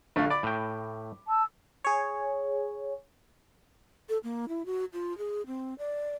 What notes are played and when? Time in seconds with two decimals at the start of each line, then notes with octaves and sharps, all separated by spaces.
0.16 A#1 D3 A3 F5
0.30 D5 B5 D6
0.43 A2 G5
1.28 A5 E6
1.85 G#4 C#5
4.09 A4
4.24 A#3
4.49 E4
4.66 F#4
4.93 F4
5.18 G#4
5.46 C4
5.79 D5